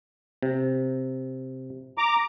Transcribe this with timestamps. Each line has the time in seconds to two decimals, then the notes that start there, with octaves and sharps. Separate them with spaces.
0.42 C3
1.98 A#5 D6